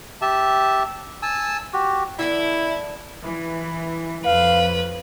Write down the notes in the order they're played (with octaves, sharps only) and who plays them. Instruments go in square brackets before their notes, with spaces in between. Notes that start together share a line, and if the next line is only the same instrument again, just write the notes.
[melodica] G4 E5 A5
G#5 A5 E6
F#4 G4
[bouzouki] D3 B3 A4 [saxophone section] E4
[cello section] E3
[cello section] F2 [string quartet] B4 [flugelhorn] F5